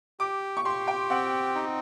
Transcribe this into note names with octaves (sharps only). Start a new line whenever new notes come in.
G4 D6
C#6
G4 C6
G5
C4 F#5
D#4